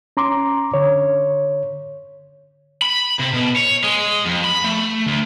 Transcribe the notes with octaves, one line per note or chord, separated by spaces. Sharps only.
C#4 A#5 C6 D6
D3 C#5
B5
C3
B2
C#5
G#3
F2
B5
A3
D2